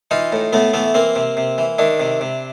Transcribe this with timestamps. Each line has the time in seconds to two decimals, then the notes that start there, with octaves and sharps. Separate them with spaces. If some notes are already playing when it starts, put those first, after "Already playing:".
0.11 E3 D#4 F4
0.32 A2
0.53 A2 A3 B3
0.73 E3 A3 B3
0.94 E3 A#3 C4
1.16 C3
1.37 C3
1.58 E3
1.78 D#3 D4 E4
2.00 C3
2.21 C3